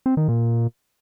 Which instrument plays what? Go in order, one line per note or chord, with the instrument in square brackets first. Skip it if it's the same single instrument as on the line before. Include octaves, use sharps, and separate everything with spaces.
[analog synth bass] C4
D#3
A#2